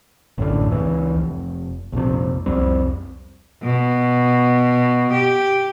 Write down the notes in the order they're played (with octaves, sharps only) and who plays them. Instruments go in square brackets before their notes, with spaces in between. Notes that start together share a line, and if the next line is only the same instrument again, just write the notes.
[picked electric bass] A1 F#2 A2 D3
C#2 E3
F1
A#1 F2 C3
C2 F2 G3 C4
[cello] B2
G4